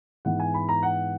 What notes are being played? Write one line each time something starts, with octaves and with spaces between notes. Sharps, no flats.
G#2 E3 B3 F#5
G#5
B5
A#5
F#5